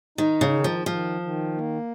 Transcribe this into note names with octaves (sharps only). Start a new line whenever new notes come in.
D#3 D#4
C#3
D#3
F3
D#3 F3
D#3
A#3